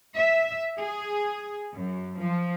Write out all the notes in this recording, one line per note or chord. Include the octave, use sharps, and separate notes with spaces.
E5
G#4
F#2
F3